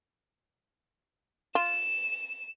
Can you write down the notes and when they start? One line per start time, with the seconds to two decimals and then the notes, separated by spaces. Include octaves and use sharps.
1.55 F4 E7